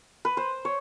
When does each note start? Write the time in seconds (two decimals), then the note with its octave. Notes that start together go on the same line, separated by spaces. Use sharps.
0.25 B4
0.37 C5
0.65 C#5